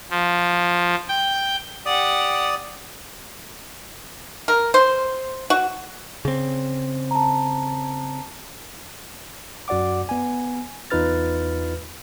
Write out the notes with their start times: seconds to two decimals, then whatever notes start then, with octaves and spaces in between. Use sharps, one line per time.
0.10 F3
1.09 G5
1.86 G4 D5 F#5 D#6
4.48 A#4
4.74 C5
5.50 F#4
6.25 C#3 C4
7.11 A5 A#5
9.68 F#2 F#4 D5 F#5 D6
10.09 B3 G#5
10.90 E2 D#4 F4 B4 F6 A6